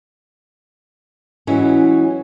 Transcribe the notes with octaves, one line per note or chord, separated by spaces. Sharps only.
E3 F#3 G#3 C#4